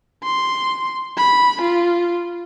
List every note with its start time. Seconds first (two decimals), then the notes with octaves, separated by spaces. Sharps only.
0.23 C6
1.17 B5
1.61 F4